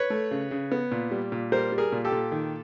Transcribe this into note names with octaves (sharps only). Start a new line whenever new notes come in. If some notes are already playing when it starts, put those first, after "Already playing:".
Already playing: B4 C#5
A3
C#3
C#3
B3
A#2
G3
A#2
G3 A#4 C5
G3
G#4 A#4
A#2
G4 A4
A#2
D#3